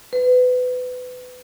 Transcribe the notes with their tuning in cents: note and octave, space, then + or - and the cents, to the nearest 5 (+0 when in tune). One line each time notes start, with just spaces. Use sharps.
B4 +25